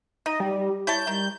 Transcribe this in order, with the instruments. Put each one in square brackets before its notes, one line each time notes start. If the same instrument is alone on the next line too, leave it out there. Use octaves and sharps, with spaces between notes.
[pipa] D#4 [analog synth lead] D#5
[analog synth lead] G3 [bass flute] G4
[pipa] E4 C#5 A5 [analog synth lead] G6
[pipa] D#3 [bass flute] G3